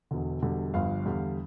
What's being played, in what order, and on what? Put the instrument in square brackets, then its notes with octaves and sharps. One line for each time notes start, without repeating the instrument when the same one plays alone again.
[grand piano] E1 E2 D3
E1 E2 D3 G3
G1 G2 F3 F5
E2 D3 G3